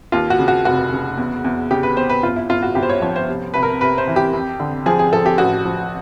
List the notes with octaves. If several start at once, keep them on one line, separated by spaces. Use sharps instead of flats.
D#2 F4
F#4
C#3
F#4
F1 F#4
C#3
E2
E2
C#3 G4
B4
E2 C5
B4
G1 F4
E4
G1 F4
F#4
G1 G4
C5
C#5
F3 C#5
C5
C3
C2 B4
A#4
C3 B4
C5
E3
G4
F2
D3
F3 G#4
G#4
F3 A4
G4
A1 F#4
F3